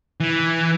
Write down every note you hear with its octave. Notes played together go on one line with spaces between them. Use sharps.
E3